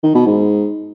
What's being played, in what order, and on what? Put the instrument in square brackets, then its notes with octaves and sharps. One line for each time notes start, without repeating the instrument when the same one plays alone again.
[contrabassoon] D#3
B2
G#2